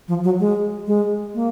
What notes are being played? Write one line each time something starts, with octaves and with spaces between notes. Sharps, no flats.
F3
F#3
G#3
G#3
A#3